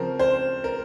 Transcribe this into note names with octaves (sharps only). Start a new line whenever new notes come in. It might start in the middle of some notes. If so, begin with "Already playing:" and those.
Already playing: C#3 F3 C4 A#4
C5
A#4